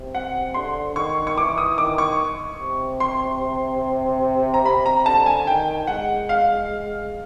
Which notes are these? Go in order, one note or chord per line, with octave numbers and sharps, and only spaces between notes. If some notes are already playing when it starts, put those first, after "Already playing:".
Already playing: C3
F#5
D3 C6
D#3 C#6
C#6
E3 D6
D#6
D#3 D6
C#6
C3
C6
A#5
C3 B5
A#5
D3 A5
G#5
D#3 G5
G#3 F#5
F5